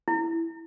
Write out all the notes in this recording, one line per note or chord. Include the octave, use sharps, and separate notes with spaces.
E4